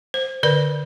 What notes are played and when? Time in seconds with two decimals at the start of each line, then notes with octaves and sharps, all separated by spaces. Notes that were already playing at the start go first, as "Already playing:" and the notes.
0.14 C5
0.43 D3 B4 D5